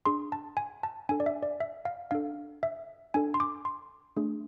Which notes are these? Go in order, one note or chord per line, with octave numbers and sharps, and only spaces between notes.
D4 G#4 C6
A5
G#5
A5
D4 A4 G#5
D5
E5
D5
E5
F5
D4 A4 F5
E5
D4 A4 G#5
C6
D6
C6
A3 D4 G#4